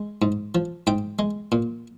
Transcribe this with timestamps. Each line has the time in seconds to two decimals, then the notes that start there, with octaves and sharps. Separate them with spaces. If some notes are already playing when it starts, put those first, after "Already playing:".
Already playing: G#3
0.22 G#2
0.55 F3
0.87 G#2 G5
1.19 G#3
1.52 A#2